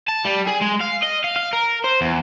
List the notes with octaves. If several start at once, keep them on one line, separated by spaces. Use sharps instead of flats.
A5
G3
G#4
G#3
F5
D#5
F5
F5
A#4
C5
E2